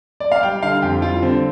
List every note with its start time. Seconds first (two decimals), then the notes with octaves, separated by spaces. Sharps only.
0.20 D5
0.32 F5
0.43 G3 G5
0.63 D3 F5
0.82 F2 G4
1.02 G3 F4
1.22 D3 C4